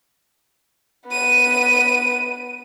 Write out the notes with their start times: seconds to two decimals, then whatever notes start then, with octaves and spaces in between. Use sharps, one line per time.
1.08 B3 D#7